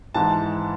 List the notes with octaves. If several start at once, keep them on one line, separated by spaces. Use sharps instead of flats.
G#2 E3 A5